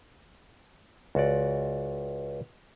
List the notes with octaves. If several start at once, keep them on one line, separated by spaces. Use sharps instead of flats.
C#2 F#4 D5